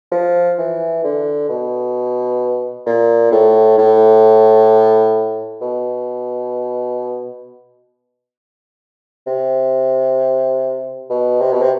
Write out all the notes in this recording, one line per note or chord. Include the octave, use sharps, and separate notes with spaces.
F3
E3
D3
B2
A#2
A2
A2
B2
C3
B2
C3
B2
C3